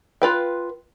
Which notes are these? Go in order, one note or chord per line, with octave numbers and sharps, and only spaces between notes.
F4 B4 G5